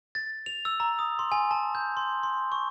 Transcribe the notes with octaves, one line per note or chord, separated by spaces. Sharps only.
A6
F7
E6
A#5
D#6
C6
G#5
A5
G6
C6
C6
C#6